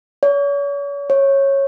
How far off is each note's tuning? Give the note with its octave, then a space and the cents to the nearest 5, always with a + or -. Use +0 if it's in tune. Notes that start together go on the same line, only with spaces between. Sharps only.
C#5 +40
C#5 -15